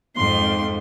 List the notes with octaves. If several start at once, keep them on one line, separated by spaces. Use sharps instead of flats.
F2 G#2 C6